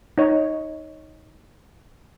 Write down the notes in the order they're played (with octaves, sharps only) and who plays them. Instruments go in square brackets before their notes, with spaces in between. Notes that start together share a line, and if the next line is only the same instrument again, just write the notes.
[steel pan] D#4 C#5